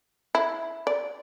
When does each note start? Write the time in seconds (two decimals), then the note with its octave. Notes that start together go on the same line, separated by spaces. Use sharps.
0.35 E4
0.87 D5